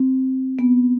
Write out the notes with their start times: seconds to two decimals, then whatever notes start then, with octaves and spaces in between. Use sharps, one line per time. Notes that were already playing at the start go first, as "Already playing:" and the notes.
Already playing: C4
0.59 B3